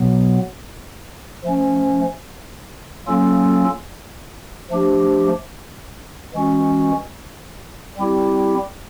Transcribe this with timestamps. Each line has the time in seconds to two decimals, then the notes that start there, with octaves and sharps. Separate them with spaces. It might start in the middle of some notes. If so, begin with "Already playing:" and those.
Already playing: B2 F#3 B3
1.44 F3 A3 C#4
3.07 F#3 A#3 C#4 F4 A4
4.70 F3 A3 D4 G4
6.34 E3 G#3 C#4 F#4
7.97 G3 C4 E4 G4